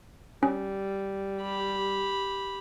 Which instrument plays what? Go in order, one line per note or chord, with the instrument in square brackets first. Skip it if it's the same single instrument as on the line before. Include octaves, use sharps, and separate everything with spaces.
[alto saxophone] G3 [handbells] C#4
[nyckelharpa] G4 B5